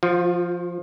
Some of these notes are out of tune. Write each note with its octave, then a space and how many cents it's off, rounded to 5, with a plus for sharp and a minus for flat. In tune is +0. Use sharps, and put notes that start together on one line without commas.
F3 +0 F4 +35